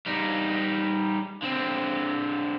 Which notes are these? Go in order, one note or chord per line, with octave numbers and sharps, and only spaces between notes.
G3 D#4
D3 C4